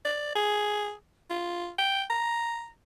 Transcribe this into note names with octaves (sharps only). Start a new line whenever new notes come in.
D5
G#4
F4
G5
A#5